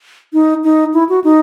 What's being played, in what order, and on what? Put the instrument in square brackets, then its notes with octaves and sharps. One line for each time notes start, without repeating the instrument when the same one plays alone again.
[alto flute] D#4
D#4
E4
F#4
D#4